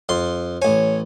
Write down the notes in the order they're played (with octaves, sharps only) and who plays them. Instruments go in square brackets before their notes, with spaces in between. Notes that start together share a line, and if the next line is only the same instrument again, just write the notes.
[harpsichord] F2 C6
[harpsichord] A1 G#5 [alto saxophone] C#5